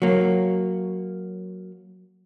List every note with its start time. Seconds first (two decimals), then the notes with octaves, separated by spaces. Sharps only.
0.02 F#3 A#3